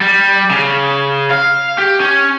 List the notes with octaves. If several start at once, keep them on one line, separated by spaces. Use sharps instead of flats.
G3
C#3
F5
G4
C#4